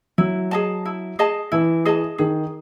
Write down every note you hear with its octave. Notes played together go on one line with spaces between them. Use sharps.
F#3 E4
G#4 D#5 A5
E4
G#4 D#5 A5
E3 E4
G#4 D#5 A5
D#3 G#4